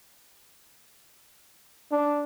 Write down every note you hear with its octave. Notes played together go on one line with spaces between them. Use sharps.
D4